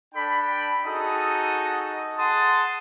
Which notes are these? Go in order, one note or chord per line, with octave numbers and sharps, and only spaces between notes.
D4 A4 G5 B5
D#4 F#4 G#4 A4 D#6
G#4 F#5 A5 C6 D#6